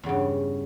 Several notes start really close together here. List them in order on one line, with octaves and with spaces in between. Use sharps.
E2 C#3 G2